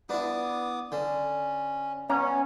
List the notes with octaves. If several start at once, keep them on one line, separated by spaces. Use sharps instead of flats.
B3 D4 E4 B4 D6 D#6
D3 C#4
B3 C#4 A#5